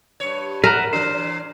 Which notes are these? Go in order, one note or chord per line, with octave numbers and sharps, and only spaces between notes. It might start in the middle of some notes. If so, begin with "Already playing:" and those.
G2 C#5
A#4 B4 E5 F#5
E3 D4 C5